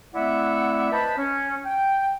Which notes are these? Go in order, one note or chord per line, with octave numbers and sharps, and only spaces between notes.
A3 C4 E4 D5 E5 F#5
B4 C5 D#5 A5 B5
C#4
G5